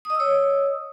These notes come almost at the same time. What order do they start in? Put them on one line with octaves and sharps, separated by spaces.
D#6 D#5 E6 C#5